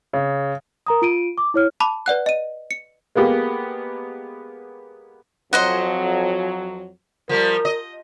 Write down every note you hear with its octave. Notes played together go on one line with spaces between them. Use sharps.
C#3
A#4 A#5 D#6
F4 D7 D#7
D6
E4 C#5 F6
A5 B5 D6 F7
B4 D5 F#5 F#6
D#5 D#7
C#7
G#3 A#3 B3 G4
F2 F#3 C5 D#5 F#5
F3 G3 A#4
D#5